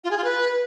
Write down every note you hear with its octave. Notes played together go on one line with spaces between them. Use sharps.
F4
G#4
F4
B4